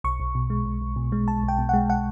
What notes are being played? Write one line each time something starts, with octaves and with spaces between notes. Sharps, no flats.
B1 C#6
B1
B2
G#3
B1
B1
B2
G#3
B1 A5
B1
G5
B2
G#3 F#5
F#5